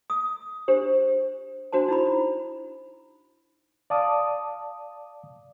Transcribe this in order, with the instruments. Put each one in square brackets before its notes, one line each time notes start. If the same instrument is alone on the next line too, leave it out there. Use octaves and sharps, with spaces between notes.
[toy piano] D#6
D4 G4 C5
D4 F#4 C5 A5
D#4 E4 B5
[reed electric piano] D5 F5 A5 D6 D#6